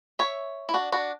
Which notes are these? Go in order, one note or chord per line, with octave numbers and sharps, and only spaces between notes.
C#5 E5
E4
D4 F#4
D4 F#4